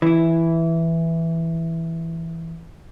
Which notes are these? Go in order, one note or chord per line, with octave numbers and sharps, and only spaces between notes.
E3 E4